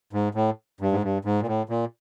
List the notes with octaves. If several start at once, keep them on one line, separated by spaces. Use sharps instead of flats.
G#2
A2
G2
G#2
G2
G#2
A#2
A2
A#2